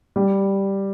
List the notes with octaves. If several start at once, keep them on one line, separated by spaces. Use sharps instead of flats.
G3